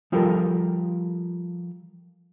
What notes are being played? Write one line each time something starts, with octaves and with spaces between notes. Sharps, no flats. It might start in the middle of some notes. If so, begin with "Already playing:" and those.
F3 G3 F4 G4 A4 A#4